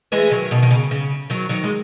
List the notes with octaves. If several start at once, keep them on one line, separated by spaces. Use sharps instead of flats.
E3 G#3
D#3 F#3
B2 D#3
D#3
C#3
C#3
D#3 F#3
D#3 F#3
G#3